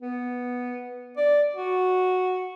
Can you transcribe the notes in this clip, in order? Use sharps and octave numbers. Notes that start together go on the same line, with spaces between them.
B3
D5
F#4